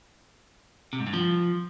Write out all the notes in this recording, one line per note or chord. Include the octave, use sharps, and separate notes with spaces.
C3
G#2
G2
F3